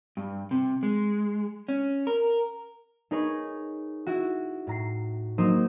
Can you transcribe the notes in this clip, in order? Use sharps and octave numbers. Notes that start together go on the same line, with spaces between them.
G2
C3
G#3
C#4
A#4
D#4 G#4 A#4 B4 C#5
E4 F#4
A2 A#5 C7
F#3 A#3 D#4 A#4 C5 D#6